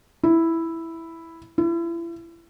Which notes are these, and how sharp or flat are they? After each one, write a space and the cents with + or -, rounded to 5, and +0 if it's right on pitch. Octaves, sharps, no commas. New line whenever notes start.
E4 +0
E4 +35